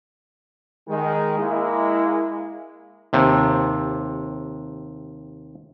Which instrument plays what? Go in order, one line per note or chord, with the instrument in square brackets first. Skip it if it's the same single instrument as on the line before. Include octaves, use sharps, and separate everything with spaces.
[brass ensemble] D#3 G#3
G#3 A#3 E4
[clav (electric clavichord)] D#2 C3